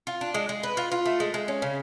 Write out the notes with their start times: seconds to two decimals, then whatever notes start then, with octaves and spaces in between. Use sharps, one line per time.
0.07 F4
0.21 D4
0.34 G#3
0.49 G#3
0.63 B4
0.77 F4
0.92 F4
1.06 A3
1.20 G#3
1.34 G#3
1.48 C#4
1.62 C#3